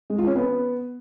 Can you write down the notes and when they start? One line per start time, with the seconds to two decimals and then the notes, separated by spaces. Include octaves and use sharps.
0.10 G#3
0.18 F4
0.27 C#4
0.36 B3